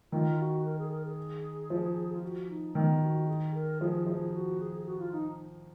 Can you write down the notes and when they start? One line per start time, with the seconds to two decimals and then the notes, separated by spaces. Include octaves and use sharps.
0.12 D#3 F4
0.39 F#4
0.65 A#4
0.79 G#4
0.91 A#4
1.05 G#4
1.70 F3
2.13 F4
2.23 F#4
2.49 D#4
2.75 D#3 B3
3.02 F#4
3.28 G#4
3.54 A#4
3.81 F3 G#4
4.06 F3 G#4
4.34 F#4
4.60 G#4
4.76 G#4
4.86 F#4
4.99 F4
5.12 D#4